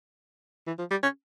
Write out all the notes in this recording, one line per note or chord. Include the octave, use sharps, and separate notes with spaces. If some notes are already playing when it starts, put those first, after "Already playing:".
E3
F3
G3
C#4